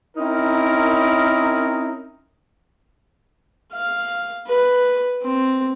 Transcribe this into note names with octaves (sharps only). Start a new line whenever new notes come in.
C4 C#4 D#4 E4 A#4
F5
B4
C4